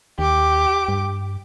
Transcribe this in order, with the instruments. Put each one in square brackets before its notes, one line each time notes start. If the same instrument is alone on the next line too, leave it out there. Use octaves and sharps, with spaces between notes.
[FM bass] D#2 [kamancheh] G4 D6
[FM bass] G2